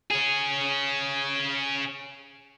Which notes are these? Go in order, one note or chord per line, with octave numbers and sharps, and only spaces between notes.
C#4 G#4